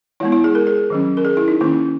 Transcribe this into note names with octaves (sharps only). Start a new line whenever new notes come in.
E3 G#3 B3 E4
E4
G#4
A#4
G#4
D#3 F#3 C#4
A#4
G#4
E4
D#4
D#3 A#3 C#4 E4